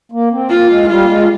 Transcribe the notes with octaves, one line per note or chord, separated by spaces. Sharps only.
A#3
C4
A#3 F4
G#3
G3 F4
A#3
G#3